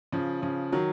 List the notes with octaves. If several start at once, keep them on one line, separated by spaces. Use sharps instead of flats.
C#3 F3
C#3 F3
D#3 F#3